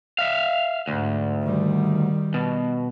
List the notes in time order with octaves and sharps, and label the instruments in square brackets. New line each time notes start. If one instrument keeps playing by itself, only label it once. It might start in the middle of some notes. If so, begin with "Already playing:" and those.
[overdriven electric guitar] E5 F5
[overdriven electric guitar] D2 [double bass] G#2
[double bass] D#3 G3
[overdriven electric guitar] B2